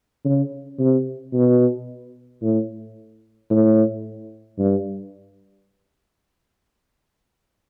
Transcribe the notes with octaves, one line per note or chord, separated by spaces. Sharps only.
C#3
C3
B2
A2
A2
G2